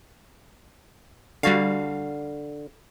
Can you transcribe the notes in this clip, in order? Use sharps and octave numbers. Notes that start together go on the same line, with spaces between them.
D3 G3 F#4 F5